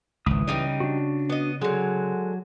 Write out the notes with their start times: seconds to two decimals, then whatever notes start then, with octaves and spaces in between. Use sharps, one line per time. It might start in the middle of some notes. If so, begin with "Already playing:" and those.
0.26 G#1 C#2 E3 D#6
0.48 C#3 G3 D#4 D#5
0.80 D4 F#4
1.30 B3 D#5
1.61 D3 F#3 G#3